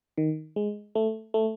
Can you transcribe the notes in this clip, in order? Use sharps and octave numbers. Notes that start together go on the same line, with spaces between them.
D#3
G#3
A3
A3